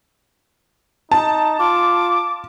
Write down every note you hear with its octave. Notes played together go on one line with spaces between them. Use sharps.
D#4 A5
F4 D6